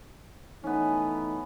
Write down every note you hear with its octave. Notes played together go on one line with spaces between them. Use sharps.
E3 A3 B3 C#4 D#4